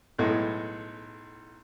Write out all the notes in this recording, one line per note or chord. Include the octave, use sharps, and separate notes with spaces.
B1 A2 G#3